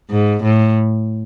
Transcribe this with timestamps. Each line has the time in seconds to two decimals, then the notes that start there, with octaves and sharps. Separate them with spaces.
0.10 G#2
0.44 A2